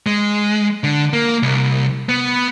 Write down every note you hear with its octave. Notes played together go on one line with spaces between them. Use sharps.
G#3
D3
A#3
C2
B3